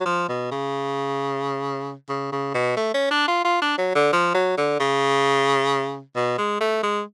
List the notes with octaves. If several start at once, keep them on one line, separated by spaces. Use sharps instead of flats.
F#3
F3
B2
C#3
C#3
C#3
B2
A3
C#4
D4
F4
F4
D4
F#3
D3
F3
F#3
D3
C#3
B2
G#3
A3
G#3